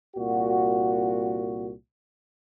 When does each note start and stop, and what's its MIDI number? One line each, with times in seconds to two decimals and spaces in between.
0.16 1.72 36
0.16 1.72 46
0.16 1.72 66